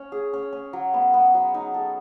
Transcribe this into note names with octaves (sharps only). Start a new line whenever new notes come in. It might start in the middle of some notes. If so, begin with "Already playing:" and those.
Already playing: C#4
G#4
C#4
C#4
F#3
B3
B3
F#3
D#4
A4